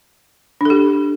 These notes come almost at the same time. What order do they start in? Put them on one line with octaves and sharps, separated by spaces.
D4 A4 G4